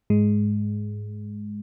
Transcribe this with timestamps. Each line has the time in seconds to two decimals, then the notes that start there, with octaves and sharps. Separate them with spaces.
0.10 G#2 G#3